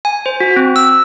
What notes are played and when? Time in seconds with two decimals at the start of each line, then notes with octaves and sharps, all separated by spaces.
0.05 G#5
0.26 C5
0.40 F#4
0.56 C4
0.76 E6